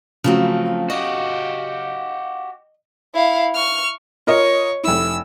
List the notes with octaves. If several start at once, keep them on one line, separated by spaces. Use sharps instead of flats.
C#3 F3 F#3 A3 C4 F5
F#4 G4 D#5
E4 F5
C#6 F6
F4 A#4 C#5 D#5
F1 E4 E6